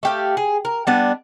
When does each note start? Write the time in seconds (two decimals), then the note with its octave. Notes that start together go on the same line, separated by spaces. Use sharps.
0.03 A3 G4 F5
0.37 G#4
0.65 A#4
0.87 G3 B3 D4